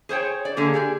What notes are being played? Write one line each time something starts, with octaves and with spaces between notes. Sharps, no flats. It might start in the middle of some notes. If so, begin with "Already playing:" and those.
G#4 C5 C#5 G5
D5
D3 A#3 G#4
G4 G#4 D5